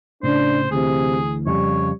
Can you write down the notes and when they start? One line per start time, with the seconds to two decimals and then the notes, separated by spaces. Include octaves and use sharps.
0.23 A2 C#3 D4 C5
0.71 D2 C3 E3 G#4
1.46 F2 C#3 G3 C#5